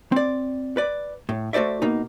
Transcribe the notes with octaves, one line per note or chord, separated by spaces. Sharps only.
C4 D5
B4 D5
A2
A3 F#4 C5 D5 E5
B2 A#3 D#4